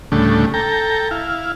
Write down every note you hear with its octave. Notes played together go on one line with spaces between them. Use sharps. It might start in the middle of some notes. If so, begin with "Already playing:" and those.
D2 A2 C#3 G3 A3 D4
A4 G5 A#5
E4 F5